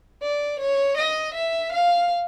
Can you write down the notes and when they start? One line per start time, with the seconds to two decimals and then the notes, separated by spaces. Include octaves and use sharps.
0.22 D5
0.59 C#5
0.97 D#5
1.34 E5
1.72 F5